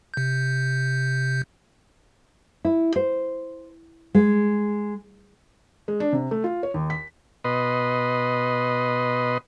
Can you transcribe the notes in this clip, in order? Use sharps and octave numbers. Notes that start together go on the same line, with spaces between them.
C3 G6
E4
C5
G#3
G#3
D4
C3
A3
F4
C#5
D#2
B6
B2 B4 D#5 C6